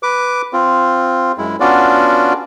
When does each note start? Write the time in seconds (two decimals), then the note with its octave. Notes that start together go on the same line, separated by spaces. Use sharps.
0.03 B4 D6
0.53 C4 F4
1.38 F#2 G#3 E4
1.60 B3 C#4 D4 F4 F#4 D5